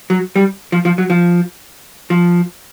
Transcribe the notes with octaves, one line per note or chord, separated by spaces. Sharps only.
F#3
G3
F3
F3
F#3
F3
F3